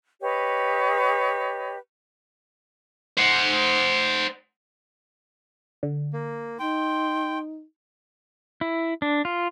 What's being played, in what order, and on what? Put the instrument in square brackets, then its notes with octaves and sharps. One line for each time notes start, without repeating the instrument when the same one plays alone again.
[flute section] G4 B4 C#5 D#5
[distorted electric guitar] C5 F#5
[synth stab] D3
[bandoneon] A#3
[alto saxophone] D#4 [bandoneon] G5 [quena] C6
[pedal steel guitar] E4
D4
F4